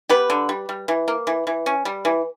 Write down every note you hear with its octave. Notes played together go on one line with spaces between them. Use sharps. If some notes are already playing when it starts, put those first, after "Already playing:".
B3 G4 B4
D3
G3
G3
E3
A#3
E3
E3
C#4
G3
E3